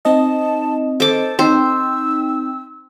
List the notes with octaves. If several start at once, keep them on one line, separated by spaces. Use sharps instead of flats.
C4 D#4 D#5 A5
A4 C5 D6
C4 D#4 C5 G5 E6